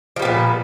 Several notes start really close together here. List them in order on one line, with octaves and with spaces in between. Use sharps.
F3 G3 B3 A#2